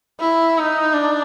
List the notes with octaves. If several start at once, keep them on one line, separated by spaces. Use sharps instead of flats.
E4
D#4
D4